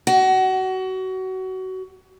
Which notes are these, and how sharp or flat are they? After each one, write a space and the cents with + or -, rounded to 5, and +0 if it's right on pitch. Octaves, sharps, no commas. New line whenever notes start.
F#4 +25